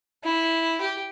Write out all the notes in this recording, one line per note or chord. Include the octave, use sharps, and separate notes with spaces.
E4
G4